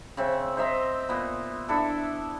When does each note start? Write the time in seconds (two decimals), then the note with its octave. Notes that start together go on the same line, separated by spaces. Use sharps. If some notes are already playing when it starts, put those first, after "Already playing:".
0.17 C#3 C4 E5
0.57 C5 D#5 E5 A#5
1.09 A#2 B3
1.68 D4 E4 A4 E5